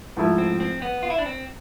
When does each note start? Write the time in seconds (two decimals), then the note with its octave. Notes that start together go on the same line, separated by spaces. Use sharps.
0.17 G#2 F3 A3 E4
0.38 C4
0.60 C4
0.82 B3
1.03 F4
1.10 E4
1.18 D4
1.26 C4